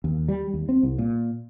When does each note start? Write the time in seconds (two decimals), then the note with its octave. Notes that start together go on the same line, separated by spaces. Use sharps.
0.04 D#2
0.28 G3
0.54 D#2
0.69 C4
0.83 C2
0.98 A#2